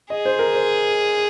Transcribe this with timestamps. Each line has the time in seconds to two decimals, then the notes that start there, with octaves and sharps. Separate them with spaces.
0.10 G#4 D#5
0.25 C5
0.39 A#4
0.54 C5